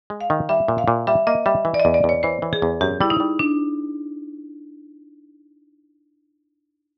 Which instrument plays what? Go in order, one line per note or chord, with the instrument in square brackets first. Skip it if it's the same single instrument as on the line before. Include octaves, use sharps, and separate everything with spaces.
[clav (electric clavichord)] G#3
[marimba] F5
[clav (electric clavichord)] D#3
[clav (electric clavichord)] G3 [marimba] E5
[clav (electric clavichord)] A#2
[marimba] F5
[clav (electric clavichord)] A#2
[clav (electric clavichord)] G3 [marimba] E5
[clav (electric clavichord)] A#3 [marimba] D#5
[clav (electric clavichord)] G3 [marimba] E5
[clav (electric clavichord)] E3
[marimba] D5
D#5
[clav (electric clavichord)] E2
[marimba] D5
[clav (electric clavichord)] E2 [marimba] C#5
[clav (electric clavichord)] E3 [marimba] C5
[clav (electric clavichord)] E3
[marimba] G#4
[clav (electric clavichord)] E2
[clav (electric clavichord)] F#2 [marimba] G4
[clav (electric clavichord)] G3 [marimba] E4
[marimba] D#4
[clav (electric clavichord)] G3
[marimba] D4